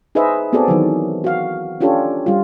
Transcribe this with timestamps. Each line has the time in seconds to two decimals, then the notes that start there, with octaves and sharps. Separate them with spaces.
0.15 D#4 G#4 B4 C5 D#5 E5
0.53 B3 C4 F#4 G#4 A4 D5
0.68 D#3 E3 F#3
1.24 F#4 F5
1.80 C#4 D4 F4 G4 A4 C#5
2.26 G3 F4